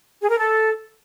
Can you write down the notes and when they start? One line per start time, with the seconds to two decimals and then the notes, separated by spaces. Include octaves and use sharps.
0.21 G#4
0.30 A#4
0.38 A4